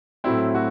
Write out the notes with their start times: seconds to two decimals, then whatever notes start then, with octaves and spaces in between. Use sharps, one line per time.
0.24 A2 F#3 A3 C4 E4
0.55 F#4